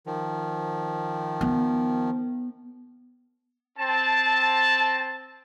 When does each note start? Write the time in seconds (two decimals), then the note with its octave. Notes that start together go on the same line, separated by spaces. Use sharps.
0.06 D#3 F3
1.41 B3
3.78 C4 A5